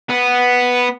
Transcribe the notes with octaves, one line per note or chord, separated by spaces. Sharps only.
B3